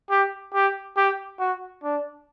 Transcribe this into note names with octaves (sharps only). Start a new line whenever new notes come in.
G4
G4
G4
F#4
D4